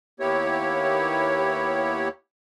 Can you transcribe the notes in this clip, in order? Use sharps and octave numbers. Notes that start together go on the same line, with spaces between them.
D#2 A#3 B3 E4 G4 C#5